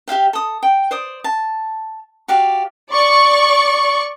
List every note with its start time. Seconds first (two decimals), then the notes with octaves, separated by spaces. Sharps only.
0.08 G4 E5 F5 G5
0.33 A4 D#6
0.63 G5
0.91 C5 D5 D#6
1.24 A5
2.28 F#4 G4 D5 F5
2.91 D5 C#6